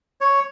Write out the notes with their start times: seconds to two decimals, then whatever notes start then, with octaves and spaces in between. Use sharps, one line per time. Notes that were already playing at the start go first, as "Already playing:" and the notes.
0.21 C#5